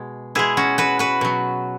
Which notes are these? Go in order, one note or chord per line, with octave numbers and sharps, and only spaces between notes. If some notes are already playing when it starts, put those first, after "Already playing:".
Already playing: B2 G#3
B2 G#3 E4 G#4
C#4 F#4
F#4 B4
F#4 B4
B2 F#3